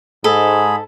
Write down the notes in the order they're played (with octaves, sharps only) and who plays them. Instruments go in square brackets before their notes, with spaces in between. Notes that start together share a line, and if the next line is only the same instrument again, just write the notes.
[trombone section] G#2 [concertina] G#4 B5 [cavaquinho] A4